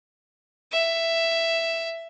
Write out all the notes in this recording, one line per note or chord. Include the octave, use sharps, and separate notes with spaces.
E5